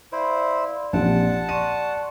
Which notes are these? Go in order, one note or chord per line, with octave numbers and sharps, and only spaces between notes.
E4 C5 D5 F5
A#1 C4 G4 D5 F#5 A5
D5 C6 C#6 D#7